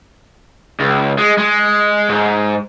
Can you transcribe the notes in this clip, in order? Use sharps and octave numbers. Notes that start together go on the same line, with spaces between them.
C#2
G#3
G#3
G#2